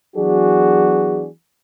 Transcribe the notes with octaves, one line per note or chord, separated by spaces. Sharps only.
E3 F#3 B3 D4 F#4 G#4